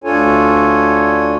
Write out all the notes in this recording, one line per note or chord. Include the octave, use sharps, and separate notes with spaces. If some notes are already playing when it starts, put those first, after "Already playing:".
D2 D4 F4 A4 C#5 G#5